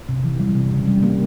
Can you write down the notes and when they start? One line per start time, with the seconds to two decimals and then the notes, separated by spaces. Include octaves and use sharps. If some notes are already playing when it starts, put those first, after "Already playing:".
0.09 C3
0.24 E3
0.40 G3
0.55 C3
0.71 C#3
0.88 G3
1.03 A#3